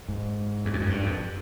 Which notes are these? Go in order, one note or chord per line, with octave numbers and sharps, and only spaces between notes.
G#2
E2
F2
F#2
G2
F2